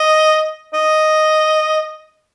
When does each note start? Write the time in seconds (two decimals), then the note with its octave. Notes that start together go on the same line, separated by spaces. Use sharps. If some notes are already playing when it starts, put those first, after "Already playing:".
Already playing: D#5
0.74 D#5